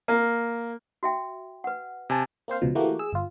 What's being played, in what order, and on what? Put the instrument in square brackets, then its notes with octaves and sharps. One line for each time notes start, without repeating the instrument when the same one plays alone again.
[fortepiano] A#3
[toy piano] F#4 E5 G5
B4 F#5
[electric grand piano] C3 G#5 A5
[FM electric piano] A#3 C4 C5 F5
C#2 B2 F3
E3 A3 A#3 F#4 G4
G#4 E6
G1 F4